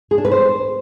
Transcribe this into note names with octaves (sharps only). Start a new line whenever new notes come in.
G#4
D4
B4
C5